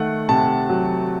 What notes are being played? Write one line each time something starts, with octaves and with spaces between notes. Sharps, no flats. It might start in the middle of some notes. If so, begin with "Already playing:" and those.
Already playing: D#3 A3 F#5
C3 A5
F#3